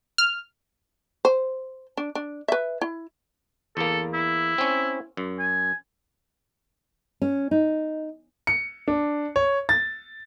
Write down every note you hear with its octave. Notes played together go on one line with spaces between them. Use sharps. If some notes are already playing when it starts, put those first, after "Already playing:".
F6
C5
D4
D4
B4 E5
E4
E2 A#3 A4
E4
C4 C#4
F#2
G#5
C#4
D#4
C#7
D4
C#5
A6